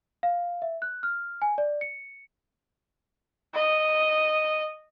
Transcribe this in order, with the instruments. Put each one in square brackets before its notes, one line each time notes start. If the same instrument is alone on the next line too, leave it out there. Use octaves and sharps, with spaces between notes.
[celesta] F5
E5
F#6
F6
G#5
D5
C#7
[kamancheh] D#5